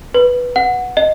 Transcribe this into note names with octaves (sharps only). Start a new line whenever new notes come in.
B4
F#5
D#5